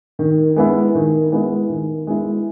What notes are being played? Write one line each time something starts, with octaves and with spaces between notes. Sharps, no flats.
D#3
G#3 B3 E4
D#3
G#3 B3 E4
D#3
G#3 B3 E4